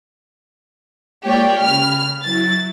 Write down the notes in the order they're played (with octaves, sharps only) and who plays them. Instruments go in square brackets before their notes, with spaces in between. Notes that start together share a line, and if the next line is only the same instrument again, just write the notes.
[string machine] G#3 A#3 F4 [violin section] G4 C#5 D5
[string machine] C#3 B5 [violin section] F6
[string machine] F#3 E4 [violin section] A6